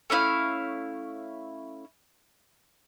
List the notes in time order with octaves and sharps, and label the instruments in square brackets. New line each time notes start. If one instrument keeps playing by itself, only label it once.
[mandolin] A3 C#4 E4 F5